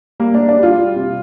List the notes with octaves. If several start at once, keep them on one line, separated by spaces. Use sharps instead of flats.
G3 A#3
G3 D4
D4
G3 F4
G3
C3